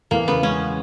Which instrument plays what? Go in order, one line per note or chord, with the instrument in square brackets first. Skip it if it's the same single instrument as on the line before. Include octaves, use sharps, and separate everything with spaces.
[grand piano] E2 [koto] A#3
[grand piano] C#3 [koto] B3
[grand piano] G#3 [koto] C#4